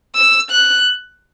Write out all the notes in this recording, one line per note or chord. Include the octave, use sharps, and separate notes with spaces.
E6
F#6